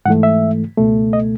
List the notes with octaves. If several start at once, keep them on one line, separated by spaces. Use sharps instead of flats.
G#2 E3 A3 F#5
E5
C#2 B2 A3
D#5